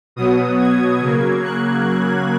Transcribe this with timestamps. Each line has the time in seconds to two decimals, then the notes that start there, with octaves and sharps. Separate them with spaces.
0.16 B2 F#3 B3 D#6
0.59 G#6
1.01 C#3 F#3 A#3
1.44 F#6